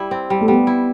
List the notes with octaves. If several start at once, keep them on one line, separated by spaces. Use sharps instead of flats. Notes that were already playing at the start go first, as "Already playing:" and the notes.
Already playing: G3 E4
C4
G3
A3
G3 B3
E4